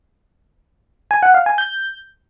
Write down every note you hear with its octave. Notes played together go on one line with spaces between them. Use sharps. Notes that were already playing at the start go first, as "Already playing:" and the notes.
G#5
F#5
F5
G#5
G6